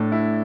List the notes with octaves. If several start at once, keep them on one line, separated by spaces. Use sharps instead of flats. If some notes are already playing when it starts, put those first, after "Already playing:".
Already playing: A2 D4
E4